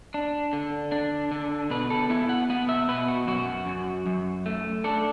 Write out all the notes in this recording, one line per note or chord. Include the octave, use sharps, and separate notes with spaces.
D4
D3
D4
D3
B2 B4
A4
B3 E4
F#5
B3 F#5
E5
B2 B4
F#4
F#2 F#4
F#2
F#2
A3
D4 A4